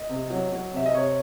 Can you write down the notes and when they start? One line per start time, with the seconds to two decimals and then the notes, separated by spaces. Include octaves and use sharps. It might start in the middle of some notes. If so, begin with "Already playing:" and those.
Already playing: D#5
0.09 C3
0.30 F#3
0.52 F#3
0.74 C3 E5
0.86 D#5
0.95 C3 C#5